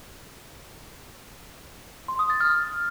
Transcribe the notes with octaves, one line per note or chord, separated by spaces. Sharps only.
C6
D#6
A6
F6